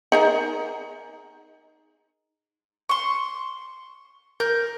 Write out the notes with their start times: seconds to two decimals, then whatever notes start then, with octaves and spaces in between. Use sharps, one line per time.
0.12 D#4 G#4 A#4
2.89 C6 C#6
4.40 A#4 G6